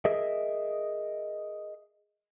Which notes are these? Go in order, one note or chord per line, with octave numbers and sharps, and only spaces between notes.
G#4 A#4 D#5 E5